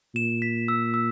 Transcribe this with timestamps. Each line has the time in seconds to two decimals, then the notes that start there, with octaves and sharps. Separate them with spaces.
0.15 A#2 E7
0.42 B6
0.68 E6
0.94 E6